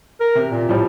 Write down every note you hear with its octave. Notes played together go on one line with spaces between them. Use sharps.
A#4
C3
A#2
A2 F3 G3